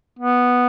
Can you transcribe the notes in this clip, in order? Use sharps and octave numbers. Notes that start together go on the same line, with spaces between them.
B3